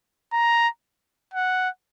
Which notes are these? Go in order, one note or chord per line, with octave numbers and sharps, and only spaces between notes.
A#5
F#5